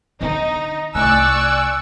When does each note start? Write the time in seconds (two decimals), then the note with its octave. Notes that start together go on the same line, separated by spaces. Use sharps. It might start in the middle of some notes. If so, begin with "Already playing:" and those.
0.21 D3 B3 D#4
0.95 C2 A3 D5 G#5 C#6 E6 F#6